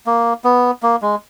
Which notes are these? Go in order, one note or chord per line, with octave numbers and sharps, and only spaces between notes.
A#3
B3
A#3
G#3